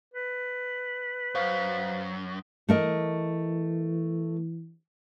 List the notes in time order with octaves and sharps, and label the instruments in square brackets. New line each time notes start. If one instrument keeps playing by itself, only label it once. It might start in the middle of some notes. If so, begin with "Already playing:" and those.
[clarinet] B4
[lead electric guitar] F#2 [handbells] C5 F5
[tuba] E3 [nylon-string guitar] A3 A#4 D#5